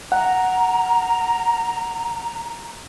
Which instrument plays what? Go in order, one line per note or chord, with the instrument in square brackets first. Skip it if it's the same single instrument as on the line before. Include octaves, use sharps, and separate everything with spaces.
[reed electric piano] F#5 [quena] A#5